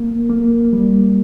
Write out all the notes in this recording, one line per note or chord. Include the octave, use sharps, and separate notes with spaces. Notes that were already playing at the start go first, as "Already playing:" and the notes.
Already playing: A#3
A#3
G3